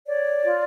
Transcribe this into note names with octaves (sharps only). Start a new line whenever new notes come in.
C#5 D5
F4